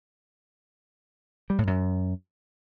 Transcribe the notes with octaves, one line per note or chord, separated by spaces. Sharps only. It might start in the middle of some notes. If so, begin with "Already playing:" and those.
G3
A2
F#2